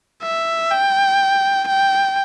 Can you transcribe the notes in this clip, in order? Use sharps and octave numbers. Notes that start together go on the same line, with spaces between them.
E5
G5
G5